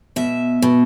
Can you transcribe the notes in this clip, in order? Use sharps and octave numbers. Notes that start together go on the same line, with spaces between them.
B2 E5
B2